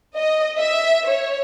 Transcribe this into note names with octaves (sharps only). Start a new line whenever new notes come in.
D#5
E5
C#5